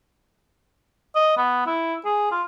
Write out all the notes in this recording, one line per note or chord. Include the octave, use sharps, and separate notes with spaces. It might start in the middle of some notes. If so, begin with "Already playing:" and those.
D#5
B3
E4
G#4
F4